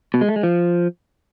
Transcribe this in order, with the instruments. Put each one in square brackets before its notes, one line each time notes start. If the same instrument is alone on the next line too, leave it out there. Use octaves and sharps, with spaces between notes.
[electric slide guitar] B2
G#3
A3
G#3
F3